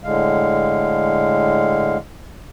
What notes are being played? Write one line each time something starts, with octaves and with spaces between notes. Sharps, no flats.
A2 D3 G#3 F5